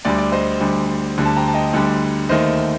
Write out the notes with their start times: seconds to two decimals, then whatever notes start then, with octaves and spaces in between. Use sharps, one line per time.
0.05 D2 D3 G3 D5
0.18 D5
0.32 C5 D#5
0.61 D2 D3 G3
1.18 D2 D3 G3
1.25 A5
1.36 G5 A#5
1.48 A5
1.54 D#5 G5
1.73 D2 D3 G3
2.29 D#2 D#3 A3 C5 D#5